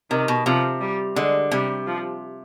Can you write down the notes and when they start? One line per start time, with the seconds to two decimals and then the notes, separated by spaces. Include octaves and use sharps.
0.11 C3 D#3
0.28 B2
0.46 C3 F3
0.80 G3
1.16 D3 G#3
1.51 C3 G3
1.87 F3